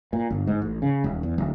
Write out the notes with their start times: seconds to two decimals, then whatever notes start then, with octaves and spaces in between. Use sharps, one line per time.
0.13 A#2
0.30 G1
0.47 G#2
0.62 A1
0.82 C#3
1.04 D#1
1.23 E2
1.38 D1